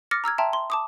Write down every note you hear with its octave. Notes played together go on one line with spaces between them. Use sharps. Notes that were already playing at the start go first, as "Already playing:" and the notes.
D6 F6 A6 A#6 C#7
A#5 E6 F6 G#6
E5 G5 A5 A#5 C6
C6
A5 D6 D#6